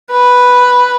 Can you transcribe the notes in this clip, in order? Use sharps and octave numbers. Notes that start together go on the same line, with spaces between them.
B4